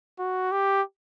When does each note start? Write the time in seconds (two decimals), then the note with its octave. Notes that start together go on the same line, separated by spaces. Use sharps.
0.19 F#4
0.52 G4